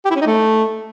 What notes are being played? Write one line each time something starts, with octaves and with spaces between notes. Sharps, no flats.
G4
E4
C#4
D#4
A3